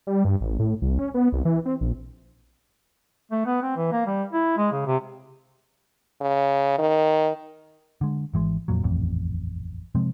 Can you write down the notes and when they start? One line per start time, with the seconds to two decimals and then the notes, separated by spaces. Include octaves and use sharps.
0.07 G3
0.25 G2
0.41 A1
0.59 A2
0.82 C2
0.99 C#4
1.14 B3
1.32 C2
1.45 E3
1.65 C4
1.81 A#1
3.31 A3
3.46 B3
3.63 C4
3.76 E3
3.92 A#3
4.06 G3
4.32 E4
4.57 G#3
4.72 C#3
4.86 C3
6.21 C#3
6.78 D#3
8.01 D3 G#3
8.34 G#1 E3 G#3
8.68 F2 A#2 F#3
8.83 D#1 A1 F2
9.95 C3 F3 G#3 C4